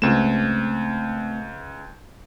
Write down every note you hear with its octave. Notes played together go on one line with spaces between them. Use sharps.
C#2 A3 C4 E7